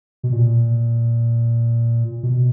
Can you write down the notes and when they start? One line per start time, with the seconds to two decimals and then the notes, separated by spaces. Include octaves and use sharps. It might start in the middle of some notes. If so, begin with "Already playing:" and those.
0.23 B2
0.32 A#2
2.23 B2